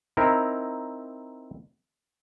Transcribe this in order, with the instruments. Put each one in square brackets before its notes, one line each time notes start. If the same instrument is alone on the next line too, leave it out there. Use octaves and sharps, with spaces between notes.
[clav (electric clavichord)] C4 D#4 E4 A#4